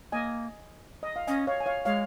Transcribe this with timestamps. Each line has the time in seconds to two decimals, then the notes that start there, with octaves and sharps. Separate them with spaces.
0.12 A#3 D#5 G#5
1.03 D#5
1.16 F5
1.27 C#4 D#5 G#5
1.47 C#5 F5
1.60 G#5
1.66 C#5 F5
1.85 G#3 C#5 F5